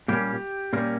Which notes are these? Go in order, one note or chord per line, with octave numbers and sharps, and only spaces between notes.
A#2 G3 A#3 C#4 G4
A#2 G3 A#3 C#4